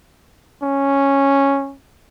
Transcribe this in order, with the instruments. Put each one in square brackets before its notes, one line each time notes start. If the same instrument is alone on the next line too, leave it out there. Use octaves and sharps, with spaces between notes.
[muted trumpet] C#4